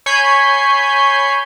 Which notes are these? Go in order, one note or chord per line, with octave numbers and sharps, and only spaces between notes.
C#5 G#5 B5 G6 C7